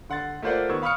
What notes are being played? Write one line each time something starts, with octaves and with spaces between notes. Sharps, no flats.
D3 F#5 C6 A6
A3 A#3 F4 C5 D5 F#5
D#3 B3 C#6 E6 G#6
F5 B5 C#6 D#6 F6 C#7